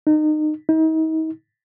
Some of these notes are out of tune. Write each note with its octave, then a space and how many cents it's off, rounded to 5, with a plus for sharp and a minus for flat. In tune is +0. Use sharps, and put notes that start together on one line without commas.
D#4 -25
D#4 +40